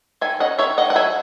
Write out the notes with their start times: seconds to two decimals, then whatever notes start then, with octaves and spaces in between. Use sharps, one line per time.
0.21 D#3 E5 G#5
0.40 C#4 D#5 F#5
0.59 D#3 C#5 E5
0.77 D#3 D#5 F#5
0.90 F#5
0.95 F#3 E5 G#5